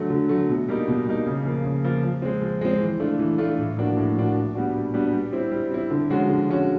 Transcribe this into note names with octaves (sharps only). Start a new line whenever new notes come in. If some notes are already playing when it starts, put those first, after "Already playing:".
Already playing: D3 F#3 A3
D3
F#3 A3
B2
G3 A#3 D#4
B2
G3 A#3 D#4
C#3
F3 A#3
C#3
F3 A#3
F3
G#3 C4
F3
G#3 C4
E3
A3 D4 F4
E3
A3 D4 F4
A2
F3 A#3 D4 F#4
A2
F3 A#3 D4 F#4
A#2
G3 B3 D4 F#4
A#2
G3 B3 D4 F#4
G3
C4 E4
G3
C4 E4
D3
F3 G#3 C#4 F#4
D3
F3 G#3 C#4 F#4